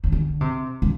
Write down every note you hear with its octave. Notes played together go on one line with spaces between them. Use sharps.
C#3
D3
C3
C3